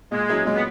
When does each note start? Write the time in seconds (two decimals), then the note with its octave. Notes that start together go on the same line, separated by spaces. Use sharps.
0.12 A#2 G#3
0.29 F#3 C#4 E4 G#4
0.46 A#2 G#3
0.55 B3